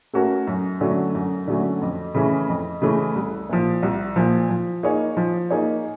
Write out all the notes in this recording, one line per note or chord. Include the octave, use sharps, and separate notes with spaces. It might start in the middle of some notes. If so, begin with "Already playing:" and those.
A3 C#4 F#4 A#4
F#2
D3 F#3 A3 C#4
F#2
D3 F#3 A3 C#4
F2
C#3 E3 A3 C#4
F2
C#3 E3 A3 C#4
C2
A#2 F3
C2
A#2 F3
F3
A#3 D#4 G#4 C#5
F3
A#3 D#4 G#4 C#5